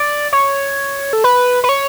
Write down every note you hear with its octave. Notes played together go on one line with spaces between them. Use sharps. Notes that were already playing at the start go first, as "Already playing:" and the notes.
Already playing: D5
C#5
A4
B4
B4
C#5